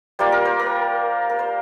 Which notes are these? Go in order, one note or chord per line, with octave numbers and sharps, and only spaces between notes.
G3 A#3 F4 C5
A#4
C5
A#4
A#4
C5